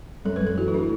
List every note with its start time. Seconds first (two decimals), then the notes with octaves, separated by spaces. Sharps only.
0.25 F#2 A4
0.36 B4
0.41 F#2
0.47 A4
0.57 E3 F#4
0.68 E4
0.73 A3 D4
0.78 E4